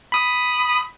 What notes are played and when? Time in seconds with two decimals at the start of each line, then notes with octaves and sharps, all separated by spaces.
0.12 B5 D#6